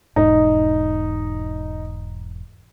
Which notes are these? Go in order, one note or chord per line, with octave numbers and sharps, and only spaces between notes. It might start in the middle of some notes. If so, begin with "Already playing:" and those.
E1 G#2 D#4